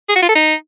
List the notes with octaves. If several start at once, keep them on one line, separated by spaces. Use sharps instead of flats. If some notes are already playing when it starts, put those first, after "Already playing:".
G#4
F#4
F4
A4
D#4